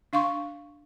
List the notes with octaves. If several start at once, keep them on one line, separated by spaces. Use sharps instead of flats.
D4 F5 C6 C#6